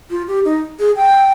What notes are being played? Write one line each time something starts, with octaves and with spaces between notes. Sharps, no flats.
F4
G4
D#4
G#4
G5